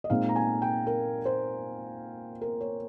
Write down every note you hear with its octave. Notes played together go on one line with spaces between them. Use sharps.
D#5
A#2 G#3 C4 D#4 F5
A#5
G#5
G5
A#4
C5
A#4
C#5